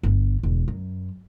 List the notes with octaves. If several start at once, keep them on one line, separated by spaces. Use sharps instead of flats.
G1
E1
F#2